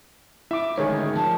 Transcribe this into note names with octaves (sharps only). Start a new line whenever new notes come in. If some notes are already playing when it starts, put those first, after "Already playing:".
E4 E5 D6
D2 G#2 D#3 G#4 C#5
F3 A5